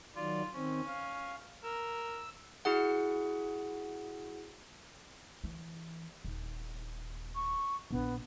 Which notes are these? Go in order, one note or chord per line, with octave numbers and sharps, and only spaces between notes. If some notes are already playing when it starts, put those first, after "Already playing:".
D#3 F#3 F4 D5
D#3 C4 C#4
F5
A#4 E6
E4 F#4 G#4 F#5
E3
D#1
C#6
A#1 B3 D4